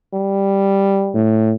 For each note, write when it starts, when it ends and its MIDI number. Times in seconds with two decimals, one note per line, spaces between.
0.14 1.28 55
1.14 1.53 45